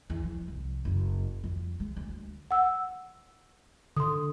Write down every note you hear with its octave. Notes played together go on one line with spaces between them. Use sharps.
E2
F3
C2
F#1
F2
G#3
D2
F#5 E6
D3 C6 D#6